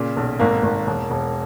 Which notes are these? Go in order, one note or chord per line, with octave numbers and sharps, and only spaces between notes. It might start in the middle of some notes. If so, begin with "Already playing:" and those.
Already playing: A#2 C#3
B1
G#1 A#3
G#1
E1
E1